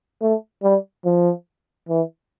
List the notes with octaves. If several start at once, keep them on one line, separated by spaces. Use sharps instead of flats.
A3
G3
F3
E3